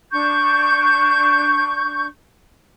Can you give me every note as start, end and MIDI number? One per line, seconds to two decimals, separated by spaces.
0.11 2.06 62
0.11 2.06 85
0.11 2.06 91